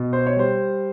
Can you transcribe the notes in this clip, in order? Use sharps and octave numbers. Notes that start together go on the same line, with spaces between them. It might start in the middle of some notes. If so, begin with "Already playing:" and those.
Already playing: B2
C5
C#5
G3 C5